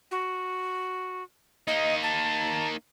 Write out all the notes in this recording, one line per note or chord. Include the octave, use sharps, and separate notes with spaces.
F#4
A#3 D#4 D#5
A5